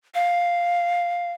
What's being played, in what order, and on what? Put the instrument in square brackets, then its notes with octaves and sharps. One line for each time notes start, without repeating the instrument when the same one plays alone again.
[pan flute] F5